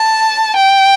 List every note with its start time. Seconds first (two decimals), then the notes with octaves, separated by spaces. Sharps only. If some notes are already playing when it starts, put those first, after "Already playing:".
Already playing: A5
0.56 G5